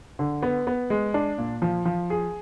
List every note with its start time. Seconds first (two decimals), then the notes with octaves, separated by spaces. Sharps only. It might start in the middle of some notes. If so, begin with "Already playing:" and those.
0.19 D3
0.43 B3
0.67 B3
0.90 G#3
1.14 D4
1.38 A#2
1.62 F3
1.85 F3
2.10 G#4